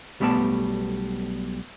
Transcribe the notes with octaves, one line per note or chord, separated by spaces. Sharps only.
B1 G3 A3 B3 D5 A5